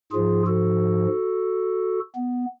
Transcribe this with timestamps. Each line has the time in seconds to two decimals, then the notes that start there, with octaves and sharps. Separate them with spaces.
0.12 G#2 F3 F4 G#4
0.46 F#4 A4
2.16 B3